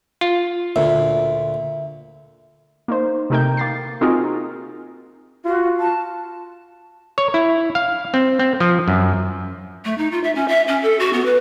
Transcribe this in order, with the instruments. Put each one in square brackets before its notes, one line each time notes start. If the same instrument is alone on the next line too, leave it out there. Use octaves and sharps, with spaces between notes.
[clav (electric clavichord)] F4
[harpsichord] D2 A#2 [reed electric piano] E5
[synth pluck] A#3 D#4 C5
C3 A3 D#4 A#4 G5 G6
A#3 A6 C7
C4 D#4 F4 F#4 G#4 A#4
[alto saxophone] F4 [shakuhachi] F#4
[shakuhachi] A5
[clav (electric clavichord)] C#5
E4
F5
C4
C4
F3
F#2
[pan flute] A3
D#4
F4
E5
C#4
E5
C#4
A4
F#4
B3
B4